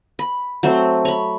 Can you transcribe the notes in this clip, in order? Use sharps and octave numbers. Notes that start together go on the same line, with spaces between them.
B5
F#3 A3 C4 C5
C#5 B5